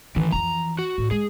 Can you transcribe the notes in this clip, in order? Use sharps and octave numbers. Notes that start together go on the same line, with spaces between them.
A2 D#3 E3
F2 E3 A#5
F#4
A2
G#3 G#4